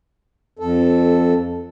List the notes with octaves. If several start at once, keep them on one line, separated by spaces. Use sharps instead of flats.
F2 A4